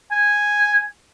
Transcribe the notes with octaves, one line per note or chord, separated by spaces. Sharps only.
G#5